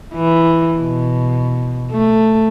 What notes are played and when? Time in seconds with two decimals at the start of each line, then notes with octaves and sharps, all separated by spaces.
0.15 E3
0.79 B2
1.91 A3